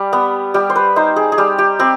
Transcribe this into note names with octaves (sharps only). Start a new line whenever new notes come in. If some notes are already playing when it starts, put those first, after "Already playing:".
Already playing: G3
B3
G3 G4
C5
B4
D#4 C5
G#4
G#4
G3 G4
G4
C4 G4